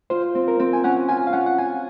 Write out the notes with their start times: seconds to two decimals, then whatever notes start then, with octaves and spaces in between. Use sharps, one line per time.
0.10 F4 C5
0.35 C4
0.48 A#4
0.60 C4
0.73 G#5
0.84 C#4 F#5
1.09 F4 G#5
1.27 F5
1.33 C#4 F#5
1.46 F#5
1.58 F4 G#5